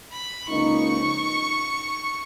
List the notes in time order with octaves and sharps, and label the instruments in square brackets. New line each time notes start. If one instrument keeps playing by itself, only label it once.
[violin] B5
[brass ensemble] C#2 C#3 F3 A#3 D#4 [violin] C#6